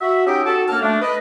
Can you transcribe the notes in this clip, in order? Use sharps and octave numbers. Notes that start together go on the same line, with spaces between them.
F#4 E5
C#4 D#4 G4 D#5 E5 G5
F#4 A4
F#2 A#3 D4 A5 F6
A3 D4
B4 D#5